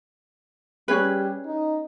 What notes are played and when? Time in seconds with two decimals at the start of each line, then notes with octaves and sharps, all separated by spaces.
0.88 G3 C#4 G#4 B4
1.46 D#4